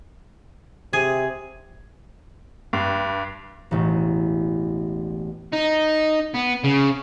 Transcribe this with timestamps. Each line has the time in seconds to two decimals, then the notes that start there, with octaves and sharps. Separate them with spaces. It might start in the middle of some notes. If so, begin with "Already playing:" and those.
0.93 C3 G#4
2.73 G2
3.71 E1 A1
5.53 D#4
6.35 B3
6.64 C#3